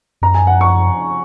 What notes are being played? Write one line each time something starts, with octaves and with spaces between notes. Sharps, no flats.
F#2 A#5
G#5
F#5
C#6